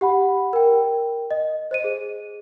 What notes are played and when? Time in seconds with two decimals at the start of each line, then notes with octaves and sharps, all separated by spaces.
0.01 G4 F#5 B5
0.53 A#4 G5
1.31 D#5
1.71 C5 D#5 D#7
1.84 G#4